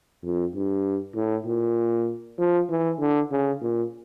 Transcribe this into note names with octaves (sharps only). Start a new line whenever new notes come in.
F2
G2
A2
A#2
F3
E3
D3
C#3
A#2